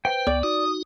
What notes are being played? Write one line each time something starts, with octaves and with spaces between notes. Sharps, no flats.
B4 C5 G5
C#2 B3 D5
D#4 F#4 D#6